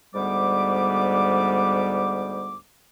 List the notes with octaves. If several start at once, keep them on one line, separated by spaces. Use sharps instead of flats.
D2 G#2 G3 B3 D6